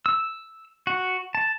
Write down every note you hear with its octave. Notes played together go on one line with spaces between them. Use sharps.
E6
F#4
A5